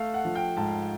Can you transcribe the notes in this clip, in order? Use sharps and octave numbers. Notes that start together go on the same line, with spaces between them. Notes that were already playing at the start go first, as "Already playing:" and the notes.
Already playing: A3 F5
F#5
F3
G5
G#2 A5